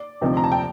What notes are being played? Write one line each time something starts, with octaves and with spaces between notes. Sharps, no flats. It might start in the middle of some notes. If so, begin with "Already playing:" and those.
Already playing: D5
D2 C3 F3 C4 D#4
A#5
A5
G5